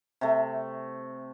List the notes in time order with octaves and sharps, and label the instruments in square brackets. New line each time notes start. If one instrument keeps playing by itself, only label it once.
[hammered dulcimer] C3 A3